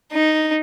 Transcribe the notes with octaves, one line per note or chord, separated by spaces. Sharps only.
D#4